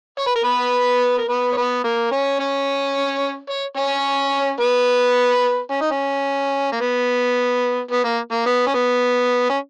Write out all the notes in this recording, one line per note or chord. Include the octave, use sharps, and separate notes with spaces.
C#5
B4
A#4
B3 B4
A#4
B3 B4
C#5
B3 B4
A#3 A#4
C#4 C#5
C#4 C#5
C#5
C#4 C#5
B3 B4
C#4
D#4
C#4
A#3
B3
B3
A#3
A#3
B3
C#4
B3
C#4